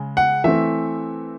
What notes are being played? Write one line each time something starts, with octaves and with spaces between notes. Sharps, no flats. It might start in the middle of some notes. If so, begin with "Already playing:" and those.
Already playing: C#3 G#3
F#5
E3 A3 C4 E5